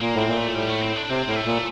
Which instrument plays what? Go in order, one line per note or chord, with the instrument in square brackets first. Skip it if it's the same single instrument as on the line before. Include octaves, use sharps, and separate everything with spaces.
[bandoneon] A#2 [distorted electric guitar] A#3
[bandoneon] A2 [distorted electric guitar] C4
[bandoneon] A#2
[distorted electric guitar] A3
[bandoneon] A2 [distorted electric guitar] G3
[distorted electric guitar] A3
C4
D4
[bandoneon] C3 [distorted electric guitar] C4
[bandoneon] A2 [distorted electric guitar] A#3
[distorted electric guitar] A3
[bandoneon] A#2